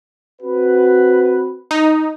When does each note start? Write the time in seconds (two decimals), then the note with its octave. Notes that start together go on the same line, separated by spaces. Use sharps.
0.41 C4 F#4 B4
1.71 D#4